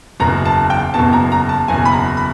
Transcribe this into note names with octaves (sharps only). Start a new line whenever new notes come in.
F#1 E2 B2 A#5
A5
G5
F#1 E2 B2 A5
A#5
A#5
A5
F#1 E2 B2 G#5
B5
A#5
B5